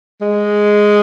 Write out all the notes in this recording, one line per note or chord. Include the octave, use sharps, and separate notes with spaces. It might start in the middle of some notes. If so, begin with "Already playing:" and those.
G#3